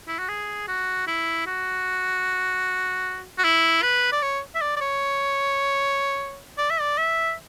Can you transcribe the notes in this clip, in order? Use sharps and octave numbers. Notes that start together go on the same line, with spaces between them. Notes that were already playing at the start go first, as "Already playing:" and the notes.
E4
F#4
G#4
F#4
E4
F#4
F#4
E4
B4
D5
C#5
E5
D5
D5
C#5
D5
E5
D5
E5